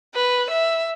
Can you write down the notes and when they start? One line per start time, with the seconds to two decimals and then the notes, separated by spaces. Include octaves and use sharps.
0.14 B4
0.50 E5